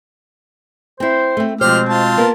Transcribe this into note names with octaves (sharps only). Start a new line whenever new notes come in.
C4 E4 C5
A3 C4
B2 F3 G#3 C4 G4 C5 F6
F4 A5
A#3 B3 A#4